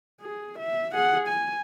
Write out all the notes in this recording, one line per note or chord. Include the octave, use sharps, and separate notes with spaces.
G#4
E5
G#4 F#5
G#5